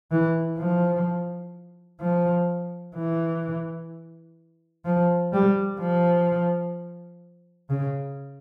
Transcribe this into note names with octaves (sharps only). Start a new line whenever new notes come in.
E3
F3
F3
E3
F3
G3
F3
C#3